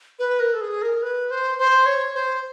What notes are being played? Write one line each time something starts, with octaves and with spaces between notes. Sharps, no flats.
B4
A#4
A4
G#4
A#4
B4
C5
C5
C#5
C5